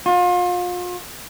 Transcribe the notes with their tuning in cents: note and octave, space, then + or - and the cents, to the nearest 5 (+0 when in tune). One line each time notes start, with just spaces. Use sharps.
F4 +35